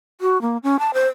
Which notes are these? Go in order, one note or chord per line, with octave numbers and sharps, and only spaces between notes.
F#4
A#3
C#4
A5
C5